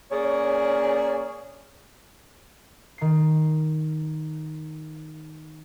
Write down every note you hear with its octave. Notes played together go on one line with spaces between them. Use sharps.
A#3 C#4 G#4 C#5 D5
D#3 C7